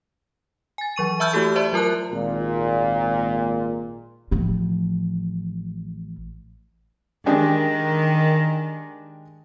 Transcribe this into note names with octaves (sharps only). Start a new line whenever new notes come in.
G#5 A6
E3 F#3 C#6 D#7
E5 A5 B5 E6 F6 G6
A3 E4 F#4 G4 A4
C5 D5 E5 A5 C6
F#3 F4 A#4 A5 F#6
G#1 A#2
A1 F3
D#3 G#3 D4 G4